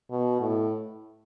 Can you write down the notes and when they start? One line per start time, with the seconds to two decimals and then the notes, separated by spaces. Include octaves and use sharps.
0.11 B2
0.41 A2